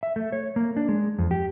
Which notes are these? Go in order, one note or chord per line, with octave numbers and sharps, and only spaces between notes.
E5
A3
C#5
A#3
D4
G#3
F2
G4